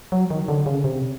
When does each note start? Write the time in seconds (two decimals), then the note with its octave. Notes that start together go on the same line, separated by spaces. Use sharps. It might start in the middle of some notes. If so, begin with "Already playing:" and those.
0.12 F#3
0.30 D#3
0.48 D3
0.66 C#3
0.84 C3